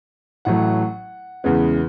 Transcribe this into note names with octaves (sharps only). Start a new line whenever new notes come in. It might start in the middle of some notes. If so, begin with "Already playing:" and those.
A1 A2 F#3 A3 F#5
E2 C#3 G#3 B3